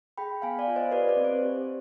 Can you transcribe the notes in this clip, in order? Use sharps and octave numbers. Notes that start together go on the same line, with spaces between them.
G#4 G5 B5
B3 F5 G#5
D5 F5
F4
C5 D#5
G4 B4 D5
B4 D5
C4
C5
G4